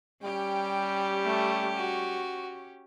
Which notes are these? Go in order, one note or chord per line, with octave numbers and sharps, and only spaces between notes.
G3 C#4 G4 G5
A3
F#4